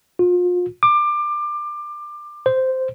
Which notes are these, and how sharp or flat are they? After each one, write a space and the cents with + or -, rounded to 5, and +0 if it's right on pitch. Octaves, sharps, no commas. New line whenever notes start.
F4 +35
D6 +25
C5 -5